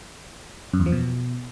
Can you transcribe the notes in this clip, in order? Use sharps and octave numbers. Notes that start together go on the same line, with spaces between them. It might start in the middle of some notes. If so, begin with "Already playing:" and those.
F#2
E2
F3
B2